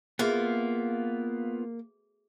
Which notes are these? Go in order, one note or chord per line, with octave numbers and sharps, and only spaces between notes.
A#3 B3 F4 F#4 G#4 E5